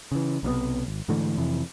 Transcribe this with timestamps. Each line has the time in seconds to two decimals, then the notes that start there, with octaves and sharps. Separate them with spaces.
0.12 C#3 E3
0.43 B1 C3 E3 B3
0.87 G#1
1.08 G#2 D3 E3 A3
1.37 F2 C3 E3